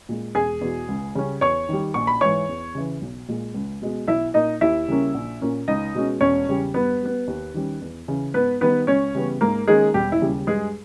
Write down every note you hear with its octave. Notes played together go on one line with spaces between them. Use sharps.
A#2 G#3
E1 G#4 G#5
E2 B2
C#2
C#3 G3 C#4
E2 C#5 C#6
D#3 G3
A#1 C#6
B5
G#2 E3 C#5 C#6
E2
C#3 E3
B1
A#2 G#3
C#2
B2 G#3 B3
B1 E4 E5
A#2 A#3 D#4 D#5
D#2 E4 E5
C#3 G3 A#3 C#4
A#1
A#2 A#3 C#4
C#2 D#4 D#5
B2 G#3 C#4
E1 C#4 C#5
E2 C#3 G3
G2 B3 B4
G3 B3
D#2
D#3 G3 C#4
E2
C#3 E3
G#2 B3 B4
D#3 G3 B3 B4
C#2 C#4 C#5
C#3 E3 G3 B3
G#2 A#3 A#4
D#3 G#3 A#3 C#4 G#4
E1 G3 G4
E4
D#2 C#3 G3
G2 G#3 G#4